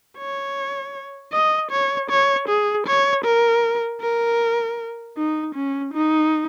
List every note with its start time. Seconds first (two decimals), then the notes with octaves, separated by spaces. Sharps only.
0.18 C#5
1.32 D#5
1.71 C#5
2.10 C#5
2.49 G#4
2.87 C#5
3.25 A#4
4.01 A#4
5.17 D#4
5.55 C#4
5.94 D#4